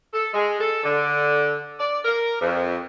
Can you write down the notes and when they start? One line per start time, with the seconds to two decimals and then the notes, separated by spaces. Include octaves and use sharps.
0.14 A4
0.34 G#3
0.60 A4
0.84 D3
1.79 D5
2.05 A#4
2.41 F2